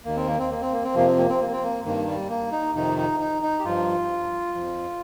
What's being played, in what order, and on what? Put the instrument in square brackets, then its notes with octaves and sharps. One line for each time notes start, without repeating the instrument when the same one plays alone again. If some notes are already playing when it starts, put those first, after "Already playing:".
[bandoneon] D#2 D#3 A#3
C4
A#3
C4
A#3
C4
A#3
C4
F2 C3 F3 A#3
C4
A#3
C4
A#3
C4
A#3
G2 D#3 A#3
G3
A#3
D#4
F2 C3 D#3 D#4
D#4
D#4
D#4
G4
G2 F3 F4
F2 F3